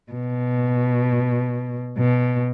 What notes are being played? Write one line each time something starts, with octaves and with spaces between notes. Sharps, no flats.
B2
B2